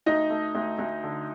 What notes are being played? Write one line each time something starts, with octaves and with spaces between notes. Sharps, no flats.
D2 D#4 D#5
A3
D2
D2
D3